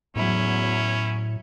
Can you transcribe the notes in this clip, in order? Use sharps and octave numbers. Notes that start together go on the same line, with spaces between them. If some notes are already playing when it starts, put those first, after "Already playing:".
E2 A2 F#3 C#4 E4